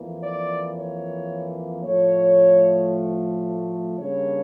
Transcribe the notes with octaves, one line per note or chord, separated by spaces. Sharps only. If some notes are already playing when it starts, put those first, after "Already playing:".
Already playing: F2 E3 A#3
D5
C#5
A2 F3 A3 C#5
C#3 G3 A#3 D4 C#5